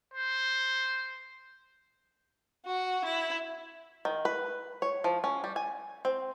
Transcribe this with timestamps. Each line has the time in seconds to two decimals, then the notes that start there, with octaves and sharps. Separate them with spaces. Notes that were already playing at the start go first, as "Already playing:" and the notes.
0.14 C5
2.65 F#4
3.05 E4
4.05 D#3
4.25 B4
4.82 C#5
5.04 F3
5.24 C#4
5.44 G3
5.56 G#5
6.05 C4